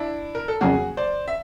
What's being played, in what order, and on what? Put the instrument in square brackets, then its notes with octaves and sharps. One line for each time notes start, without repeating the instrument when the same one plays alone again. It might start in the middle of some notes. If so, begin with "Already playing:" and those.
Already playing: [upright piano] D4 E4
A#4
A4
[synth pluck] F2 C#3 F#3 A#3 [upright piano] F#4 G#4
[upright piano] C5 D5
E5